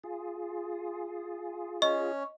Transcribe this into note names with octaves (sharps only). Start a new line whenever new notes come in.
F4 G#4
C#4 D#5 C#6